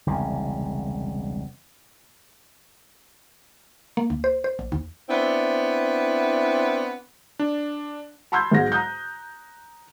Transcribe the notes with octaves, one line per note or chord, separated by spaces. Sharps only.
E1 C2 C#3
A#3
D2
C5
C5
A#1
D#2
B3 C4 D4 E4
D4
A5 B5 C6 E6 G6 G#6
B1 G#2 G#3 A#6
A#5 D#6 F#6 G6